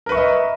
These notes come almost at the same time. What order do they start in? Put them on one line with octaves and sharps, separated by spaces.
A#4 B4 C#6 E5 D#5